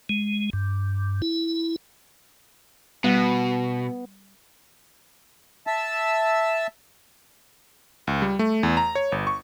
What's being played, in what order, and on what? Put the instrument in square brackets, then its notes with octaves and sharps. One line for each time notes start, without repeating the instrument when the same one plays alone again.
[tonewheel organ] G#3
G2
E4
[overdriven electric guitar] B2 [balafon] G3 [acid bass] B3
[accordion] E5 A5 E6
[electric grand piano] C#2
G3
A3
E2
A#5
C#5
G1
C#6